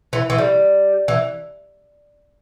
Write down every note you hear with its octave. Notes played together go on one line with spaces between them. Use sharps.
E3
E3
G3
E3